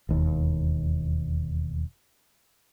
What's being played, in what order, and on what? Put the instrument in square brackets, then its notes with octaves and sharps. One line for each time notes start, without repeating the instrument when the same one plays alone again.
[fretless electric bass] E1 D#2